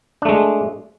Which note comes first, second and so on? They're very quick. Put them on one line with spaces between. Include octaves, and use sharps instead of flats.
D4 A3 G#3